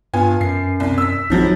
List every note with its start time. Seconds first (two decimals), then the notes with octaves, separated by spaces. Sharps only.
0.14 G2 B3 F4 G#5
0.41 F#2 C7
0.80 C2
0.98 E6 B6
1.30 A#1 D#3 F3 F#3